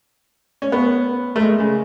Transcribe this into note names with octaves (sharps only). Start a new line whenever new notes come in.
C#4
B3
A3
G#3
C#3